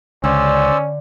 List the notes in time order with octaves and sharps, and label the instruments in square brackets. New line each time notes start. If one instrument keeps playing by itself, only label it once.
[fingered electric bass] C#2 [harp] D3 [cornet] C#4 [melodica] C5 D5 E6